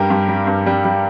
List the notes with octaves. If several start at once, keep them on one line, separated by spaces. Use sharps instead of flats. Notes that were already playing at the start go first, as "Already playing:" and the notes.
Already playing: G2 G3 G4 A#4
G2
G3
G2
G3
G3